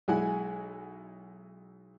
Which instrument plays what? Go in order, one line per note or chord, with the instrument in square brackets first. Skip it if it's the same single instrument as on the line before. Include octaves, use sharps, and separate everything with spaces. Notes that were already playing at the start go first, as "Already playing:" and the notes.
[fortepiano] B1 G#3 E4 F#5 G#5